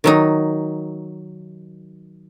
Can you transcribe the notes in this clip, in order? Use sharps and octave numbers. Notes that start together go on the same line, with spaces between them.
D#3 F#3 D#4